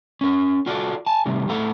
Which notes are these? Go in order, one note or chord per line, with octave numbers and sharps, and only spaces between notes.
C#4 A#4
F4 F#4 A4 D5
G#5 A5
C3 D#3 G3 A3
A2 A3 A4 F#5 A#5